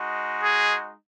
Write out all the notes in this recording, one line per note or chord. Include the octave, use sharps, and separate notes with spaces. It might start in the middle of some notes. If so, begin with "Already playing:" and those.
Already playing: G#3 D#4 F#4
G#4